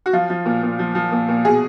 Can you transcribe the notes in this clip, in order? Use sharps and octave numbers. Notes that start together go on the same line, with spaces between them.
F#4
F3 F4
F3
A#2
A#2
F3
F3
A#2
A#2
B2 G#4